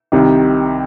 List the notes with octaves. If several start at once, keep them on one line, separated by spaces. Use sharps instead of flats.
C2 C3 D#3